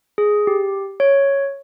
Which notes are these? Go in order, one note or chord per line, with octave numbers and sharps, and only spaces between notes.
G#4
G4
C#5